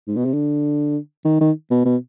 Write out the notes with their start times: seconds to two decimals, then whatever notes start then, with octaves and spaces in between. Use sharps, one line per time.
0.07 G#2
0.16 B2
0.25 C3
0.33 D3
1.25 D#3
1.40 D#3
1.71 B2
1.85 B2